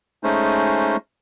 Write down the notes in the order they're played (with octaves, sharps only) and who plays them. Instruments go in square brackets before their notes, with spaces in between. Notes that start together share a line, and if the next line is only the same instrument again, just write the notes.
[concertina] G#3 A3 C#4 D#4 C5